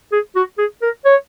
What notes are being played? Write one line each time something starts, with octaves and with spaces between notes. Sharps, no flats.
G#4
F#4
G#4
A#4
C#5